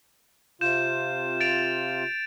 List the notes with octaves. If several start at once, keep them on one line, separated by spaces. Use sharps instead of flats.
C3 F4 G6 E7
A6 D7 F7